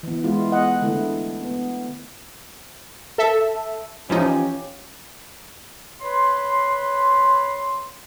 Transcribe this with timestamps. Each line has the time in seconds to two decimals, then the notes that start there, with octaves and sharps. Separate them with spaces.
0.03 E3 B3
0.24 G#3 E4 F4
0.52 B3 D#5 F#5
0.82 D3 A3 E4
1.42 B3
3.18 A4 E5
4.10 E3 F3 C#4 D#4 F4 G4 G#5
6.01 B4 C#5 B5 C6